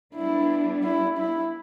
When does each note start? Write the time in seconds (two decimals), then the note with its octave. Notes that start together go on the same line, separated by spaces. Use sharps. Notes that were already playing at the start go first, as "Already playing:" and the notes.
0.14 G3 B3 D4 E4
0.84 E4
1.18 E4